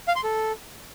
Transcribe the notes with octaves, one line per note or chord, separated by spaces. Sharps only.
F5
C6
A4